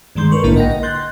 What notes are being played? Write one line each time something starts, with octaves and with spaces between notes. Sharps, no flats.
G2 D#3 G#3 C6 G6
A#4 B4 C#6
A#1 G#2 D3 A#3 E4 A#4
D#5 F#5 G5 A#6
D#5
C6 F#6 G6 A6